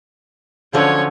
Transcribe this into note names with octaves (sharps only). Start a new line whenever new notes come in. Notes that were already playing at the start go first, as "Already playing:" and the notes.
D3 F3 F#3 C#4 C#5